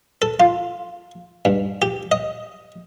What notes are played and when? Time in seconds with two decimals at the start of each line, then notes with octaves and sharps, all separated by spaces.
0.22 A4
0.40 F4
1.45 G2
1.82 G4
2.12 D#5